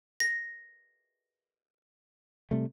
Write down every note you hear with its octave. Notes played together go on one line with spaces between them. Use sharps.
A#6
C3 G3 A3